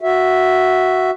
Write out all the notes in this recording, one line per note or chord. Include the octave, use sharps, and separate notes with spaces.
F#4 E5